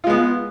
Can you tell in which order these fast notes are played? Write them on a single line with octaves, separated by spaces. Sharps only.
F4 G#3 B3